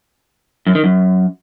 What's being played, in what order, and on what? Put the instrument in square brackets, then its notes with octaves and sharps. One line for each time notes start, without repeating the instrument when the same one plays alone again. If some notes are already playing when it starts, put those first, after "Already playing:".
[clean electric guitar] F#2
D#3
F#2